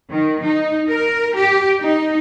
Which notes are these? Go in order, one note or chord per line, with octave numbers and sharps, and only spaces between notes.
D#3
D#4
A#4
G4
D#4